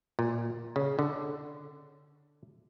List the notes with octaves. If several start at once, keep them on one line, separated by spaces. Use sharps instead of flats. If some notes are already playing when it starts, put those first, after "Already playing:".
A#2
C#3
D3